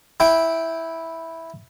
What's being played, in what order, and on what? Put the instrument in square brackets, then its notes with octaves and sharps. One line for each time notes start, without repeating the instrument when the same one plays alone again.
[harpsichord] E4 G5 D6